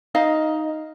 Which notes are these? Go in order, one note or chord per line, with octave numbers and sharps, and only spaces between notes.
D#4 D#5 F5